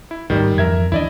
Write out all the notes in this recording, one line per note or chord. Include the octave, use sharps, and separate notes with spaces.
E4
A1 G#2 D#3 G3
F2 E3 A#4 E5 G#6
D2 E3 D4 E4 D5 D#5